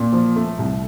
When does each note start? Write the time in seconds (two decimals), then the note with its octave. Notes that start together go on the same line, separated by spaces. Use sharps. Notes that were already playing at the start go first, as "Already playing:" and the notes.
Already playing: A#2
0.13 F3
0.36 A3
0.59 C2